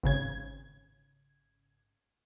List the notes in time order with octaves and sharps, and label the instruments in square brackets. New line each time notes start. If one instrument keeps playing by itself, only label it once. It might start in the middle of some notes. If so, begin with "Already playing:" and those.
[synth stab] G#1 C#3 G#6